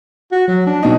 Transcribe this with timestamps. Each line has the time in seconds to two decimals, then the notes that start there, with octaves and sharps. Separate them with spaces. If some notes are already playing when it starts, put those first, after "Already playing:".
0.31 F#4
0.48 F#3
0.66 D4
0.83 B2 D#4